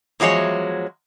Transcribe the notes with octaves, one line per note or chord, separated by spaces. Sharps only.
E2 F3 F#3 G#3 C#5